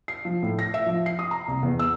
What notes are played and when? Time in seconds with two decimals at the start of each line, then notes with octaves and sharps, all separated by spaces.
0.08 C7
0.25 F3
0.43 A2
0.59 A#6
0.74 E5
0.86 F3
1.06 C7
1.19 D#6
1.31 A#5
1.48 C2
1.63 E2
1.79 E6